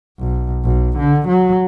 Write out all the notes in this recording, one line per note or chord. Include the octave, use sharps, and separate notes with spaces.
B1
B1
D3
F#3